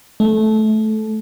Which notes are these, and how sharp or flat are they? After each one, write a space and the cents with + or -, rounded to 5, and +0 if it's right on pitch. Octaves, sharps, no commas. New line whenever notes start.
A3 -20